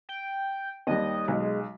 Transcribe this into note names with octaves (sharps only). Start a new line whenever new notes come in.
G5
D#2 G3 D#5
B1 G#3